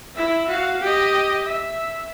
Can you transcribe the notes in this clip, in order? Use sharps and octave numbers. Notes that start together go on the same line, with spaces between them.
E4 E5
F#4 F5
G4 D#5
E5